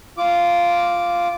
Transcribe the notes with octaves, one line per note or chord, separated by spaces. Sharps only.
F4 D6